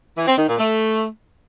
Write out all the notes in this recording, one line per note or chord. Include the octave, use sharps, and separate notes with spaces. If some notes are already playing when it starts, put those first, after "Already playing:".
E3
C4
D#3
A#2
A3